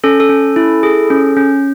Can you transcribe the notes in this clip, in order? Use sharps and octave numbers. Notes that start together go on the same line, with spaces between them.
C#4 A4
A4
C#4
E4
G#4
C#4
C#4